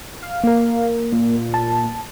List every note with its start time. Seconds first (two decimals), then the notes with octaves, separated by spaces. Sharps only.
0.22 F5
0.44 A#3 A#4
1.12 A#2
1.54 A5